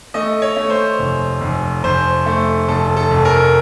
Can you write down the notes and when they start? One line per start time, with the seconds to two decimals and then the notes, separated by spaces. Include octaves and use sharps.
0.14 A3 D#5
0.42 C#5
0.57 A3
0.70 C5
0.99 F1
1.41 F1
1.83 F1 C5
2.26 A3
2.68 F1 A4
2.97 A4
3.11 F1
3.25 A#4